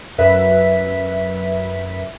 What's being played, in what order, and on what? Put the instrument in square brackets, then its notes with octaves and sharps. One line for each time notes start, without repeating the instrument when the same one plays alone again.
[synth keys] F#2 B4 E5 B6